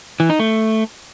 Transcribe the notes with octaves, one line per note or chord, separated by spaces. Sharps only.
E3
D#4
A3